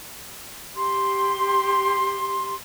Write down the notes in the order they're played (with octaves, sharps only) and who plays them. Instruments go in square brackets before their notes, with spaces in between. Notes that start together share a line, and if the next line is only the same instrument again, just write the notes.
[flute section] G4 C6